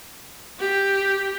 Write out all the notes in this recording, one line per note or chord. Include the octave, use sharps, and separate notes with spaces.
G4